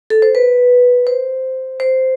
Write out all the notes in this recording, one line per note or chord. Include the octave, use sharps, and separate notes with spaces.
A4
C5
B4
C5
C5